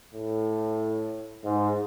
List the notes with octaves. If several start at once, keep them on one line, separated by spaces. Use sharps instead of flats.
A2
G#2